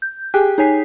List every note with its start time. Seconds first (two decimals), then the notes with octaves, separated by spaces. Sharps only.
0.02 G6
0.34 G4 G#4 G5 G#5 F#6
0.58 D#4 G#4 C#5 G#5 B6 C7